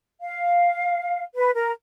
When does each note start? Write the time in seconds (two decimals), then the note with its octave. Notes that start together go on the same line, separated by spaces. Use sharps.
0.21 F5
1.34 B4
1.54 A#4